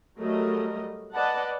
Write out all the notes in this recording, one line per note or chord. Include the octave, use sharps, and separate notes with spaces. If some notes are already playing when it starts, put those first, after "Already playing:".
F#3 G3 A3 A#4 D#5
B4 D5 D#5 F#5 A5